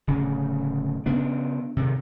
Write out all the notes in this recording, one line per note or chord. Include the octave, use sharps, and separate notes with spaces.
D1 C#3
C#3 B3 D4
C3 D#3